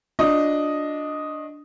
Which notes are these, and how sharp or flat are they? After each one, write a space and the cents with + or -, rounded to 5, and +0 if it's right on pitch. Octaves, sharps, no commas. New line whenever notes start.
D4 +0 F#4 -45 D#5 +0